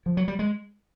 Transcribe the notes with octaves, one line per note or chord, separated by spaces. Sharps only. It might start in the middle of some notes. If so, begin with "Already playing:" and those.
F3
F#3
G3
G#3